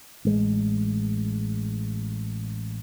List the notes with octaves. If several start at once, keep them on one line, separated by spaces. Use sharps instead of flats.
A1 G#3